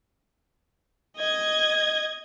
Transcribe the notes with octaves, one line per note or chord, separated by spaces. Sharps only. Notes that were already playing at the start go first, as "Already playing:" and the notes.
D#5 G#6